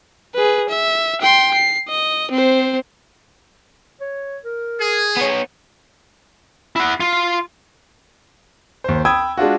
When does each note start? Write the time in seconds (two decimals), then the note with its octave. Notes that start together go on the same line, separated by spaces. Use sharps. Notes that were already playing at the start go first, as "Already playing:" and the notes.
0.34 G#4 B4
0.69 E5
1.21 G5 C6
1.54 C7
1.88 D#5
2.31 C4 C5
4.01 C#5
4.44 A#4
4.81 G#4
5.17 B3 C#5
6.76 E4 F#5
7.00 F4
8.84 D#2 C5
9.05 G5 B5 D#6 E6 G#6
9.37 G#3 D4 F4 F#4